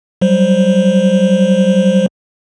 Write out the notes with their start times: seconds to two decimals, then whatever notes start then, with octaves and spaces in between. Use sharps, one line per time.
0.21 F#3 G3 C5